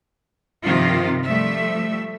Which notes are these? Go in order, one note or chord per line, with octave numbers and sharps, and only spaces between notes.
G2 C3 D#3 F3 F4
F3 G3 A3 E5